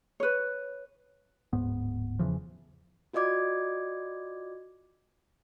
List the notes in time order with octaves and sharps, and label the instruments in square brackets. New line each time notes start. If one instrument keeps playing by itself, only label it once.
[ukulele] B4 C#5
[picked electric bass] D1 G#2 B3
E2 C#3 E3 F3
[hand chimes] F4 F#4 D5 D#5 D6 G#6